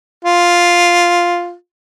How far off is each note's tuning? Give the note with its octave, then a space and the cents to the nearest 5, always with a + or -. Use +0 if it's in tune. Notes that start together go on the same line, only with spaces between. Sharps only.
F4 +0